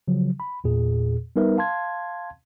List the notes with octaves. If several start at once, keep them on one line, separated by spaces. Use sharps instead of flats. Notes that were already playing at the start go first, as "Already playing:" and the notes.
C#3 F3 F#3
B5
E2 A#2 G#4
G3 B3 D#4 A#4 B4 E5
F5 A5 C6 G#6